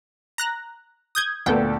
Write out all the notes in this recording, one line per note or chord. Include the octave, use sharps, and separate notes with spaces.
A#5 F#6 A#6
D#6 G6 G#6
D2 A#2 B3 A4 G5